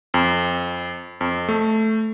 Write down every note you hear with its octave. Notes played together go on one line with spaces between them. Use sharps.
F2
F2
A3